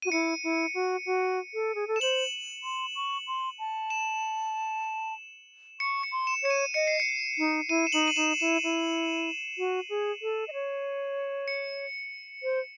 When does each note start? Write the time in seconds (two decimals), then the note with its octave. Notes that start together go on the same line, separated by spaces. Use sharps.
0.02 F#4 D#7
0.12 E4 C#7
0.44 E4
0.74 F#4
1.06 F#4
1.54 A4
1.75 G#4
1.88 A4
1.96 E7
2.01 C5 F#7
2.64 C6
2.96 C#6
3.28 C6
3.59 A5
3.90 E7
5.80 C#6 C#7
6.03 C#7
6.12 C6
6.27 E7
6.43 C#5 C#7
6.50 D#7
6.74 D#5 C#7
6.87 C7
7.00 C#7
7.38 D#4
7.69 E4 D#7
7.87 E7
7.92 D#4 F#7
8.08 D#7
8.16 D#4 E7
8.40 E4 E7
8.64 E4
9.58 F#4
9.90 G#4
10.22 A4
10.48 D#5
10.53 C#5
11.48 C#7
12.43 C5